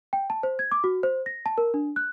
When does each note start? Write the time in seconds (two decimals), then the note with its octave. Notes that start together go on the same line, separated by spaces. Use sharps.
0.13 G5
0.30 A5
0.43 C5
0.59 G#6
0.72 D6
0.84 F#4
1.03 C5
1.26 A#6
1.46 A5
1.58 A#4
1.74 D4
1.96 F#6